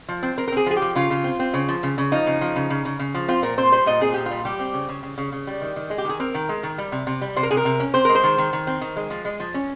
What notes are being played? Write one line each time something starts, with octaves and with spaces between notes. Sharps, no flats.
F3
C4
C4 A#4
A#4
C4 G#4
F3 G#4
G4
F3
C#3 F4
C#3
C4
C4
C#3
F3
C#3
C#3
F3 D#4
C#3
F3
C#3
C#3
C#3
C#3
F3
C4 F4
A#2 A#4
C4 C5
G3 C5
A#2 D#5
C4 G#4
A#2 G4
G3 F4
G3 G4
C4
C#3
C#3
C#3
C#3
C#3
G3
D#3
D#3
G#3
G4
D#3 G#4
C4 A#4
D#3
G#3
D#3
G3
C3
C3
G3
C3 C5
A#4
C3 G#4
A#4
C3
C#4
C4 C5
G#3 A#4
C5
D#3
D#3
D#3
C4
D#3
G#3
F3
G#3
F3
C#4